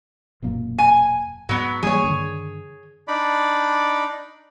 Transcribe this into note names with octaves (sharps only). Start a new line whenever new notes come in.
E1 F#2 A#2
G#5
G#2 F#3 B3
E3 G3 A#3 G#4 C#5
G2 D3 D#3
D4 D#4 D5 B5